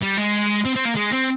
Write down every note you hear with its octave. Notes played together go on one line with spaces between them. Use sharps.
G3
G#3
C4
C4
A#3
G#3
C4